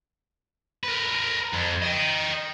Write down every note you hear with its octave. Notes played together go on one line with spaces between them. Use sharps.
A#4 B4
F2
D#5 G5